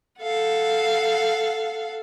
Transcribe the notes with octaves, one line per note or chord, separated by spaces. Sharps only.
A4 F5 F#5